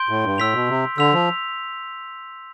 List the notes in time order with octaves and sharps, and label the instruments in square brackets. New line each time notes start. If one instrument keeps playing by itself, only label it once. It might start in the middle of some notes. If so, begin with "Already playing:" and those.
Already playing: [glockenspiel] C6 G6 D7 G7
[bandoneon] A2
G2
[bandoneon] A2 [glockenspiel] E6 B6 F7
[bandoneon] B2
C3
[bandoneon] D3 [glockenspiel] E6 B6 F7
[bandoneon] F3